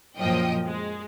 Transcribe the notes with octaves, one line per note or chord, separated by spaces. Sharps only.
F#2 A#2 F3 D#5 G5
G#3